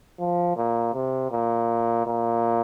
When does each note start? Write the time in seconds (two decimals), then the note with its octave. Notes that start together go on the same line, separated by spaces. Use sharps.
0.20 F3
0.57 A#2
0.94 C3
1.31 A#2
2.06 A#2